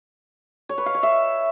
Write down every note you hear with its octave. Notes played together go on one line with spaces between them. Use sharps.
C#5
B4
F5
C#5
E5